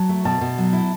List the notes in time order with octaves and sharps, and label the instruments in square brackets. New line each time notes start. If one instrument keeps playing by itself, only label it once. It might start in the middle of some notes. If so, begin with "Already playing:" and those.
Already playing: [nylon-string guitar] F#3 [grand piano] A5
[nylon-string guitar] A3
[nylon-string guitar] B2 [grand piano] A5
[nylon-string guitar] B2
F#3
E4